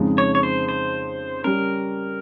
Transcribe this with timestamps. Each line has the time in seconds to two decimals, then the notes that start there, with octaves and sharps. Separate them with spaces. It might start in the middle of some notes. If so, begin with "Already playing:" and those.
Already playing: F2 C#3 F3 G#3 D#4
0.18 C#5
0.35 C#5
0.43 C5
0.69 C5
1.44 G3 C#4 A#4